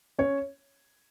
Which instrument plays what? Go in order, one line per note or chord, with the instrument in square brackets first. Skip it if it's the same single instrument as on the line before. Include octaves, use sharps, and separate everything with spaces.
[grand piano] C#4 C#5